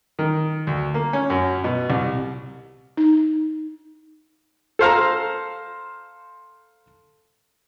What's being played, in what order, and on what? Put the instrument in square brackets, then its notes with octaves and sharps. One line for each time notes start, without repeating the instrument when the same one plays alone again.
[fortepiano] D#3
D2
A#3
C#4
F#2
B2
C2
[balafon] D#4
[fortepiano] A4 C5 F5 A#5